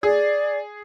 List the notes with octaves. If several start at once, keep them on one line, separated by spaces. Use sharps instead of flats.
G#4 D5